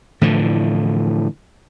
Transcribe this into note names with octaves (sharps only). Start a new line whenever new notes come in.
A2 D3 E3 F3